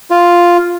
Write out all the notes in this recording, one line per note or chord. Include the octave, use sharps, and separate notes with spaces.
F4